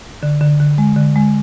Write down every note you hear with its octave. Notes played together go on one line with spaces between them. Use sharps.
D3
D3
D3
G#3
D3
G#3